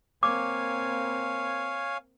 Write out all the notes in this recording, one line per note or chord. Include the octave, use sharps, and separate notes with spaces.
A#3 C4 C#5 F5 G#5 D6